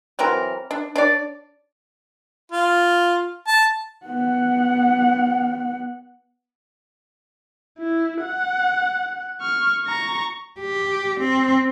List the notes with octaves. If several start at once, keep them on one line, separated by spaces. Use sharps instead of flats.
E3 F#3 C4 A#4
D4
D4 C#5 D5
F4
A5
B3 F#5
E4
F#5
C#6 F6
A#5 C#6
G4
C4